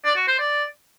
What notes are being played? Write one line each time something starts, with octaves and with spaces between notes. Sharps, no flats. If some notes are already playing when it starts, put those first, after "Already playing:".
D5
F#4
C5
D5